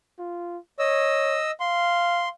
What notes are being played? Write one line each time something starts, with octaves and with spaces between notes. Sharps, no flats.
F4
C#5 D#5 E6
F5 C6